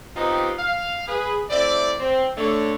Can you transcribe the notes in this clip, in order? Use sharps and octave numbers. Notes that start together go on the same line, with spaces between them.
B3 C4 D#4 F4 G4
F5
G#4 B4
A3 C4 E4 D5
C4
D3 A3 C#5